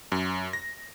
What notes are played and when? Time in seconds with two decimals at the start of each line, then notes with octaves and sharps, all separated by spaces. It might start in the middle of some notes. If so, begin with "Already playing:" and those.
0.12 F#2
0.53 A#6